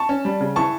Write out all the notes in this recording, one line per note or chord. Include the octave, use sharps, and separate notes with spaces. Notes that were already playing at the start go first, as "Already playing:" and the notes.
Already playing: A5 C#6
C#4
G3
C#3
E3 A5 C#6